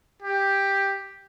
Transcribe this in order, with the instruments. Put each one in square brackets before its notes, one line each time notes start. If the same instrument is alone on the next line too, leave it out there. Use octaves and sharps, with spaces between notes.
[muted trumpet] G4